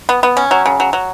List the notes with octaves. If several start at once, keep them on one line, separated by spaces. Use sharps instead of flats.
B3
B3
C#4
F#3
C#3
F#3
F#3